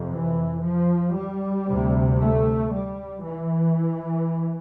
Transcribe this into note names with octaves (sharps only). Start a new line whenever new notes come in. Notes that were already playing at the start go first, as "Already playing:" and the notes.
Already playing: F2 C3
E3
F3
G3
D2 C3
A3
G3
E3